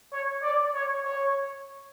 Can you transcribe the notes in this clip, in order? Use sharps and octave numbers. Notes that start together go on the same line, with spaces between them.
C#5
D5
C#5
C#5